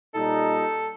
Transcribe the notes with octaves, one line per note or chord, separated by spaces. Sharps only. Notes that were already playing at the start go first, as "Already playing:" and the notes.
A#2 G3 D#4 A4